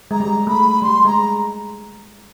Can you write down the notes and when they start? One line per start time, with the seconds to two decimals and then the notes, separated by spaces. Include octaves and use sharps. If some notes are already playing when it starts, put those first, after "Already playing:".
0.11 G#3 A#5
0.20 G3
0.28 G#3
0.47 A3 B5
0.82 G3 C6
1.05 G#3 A#5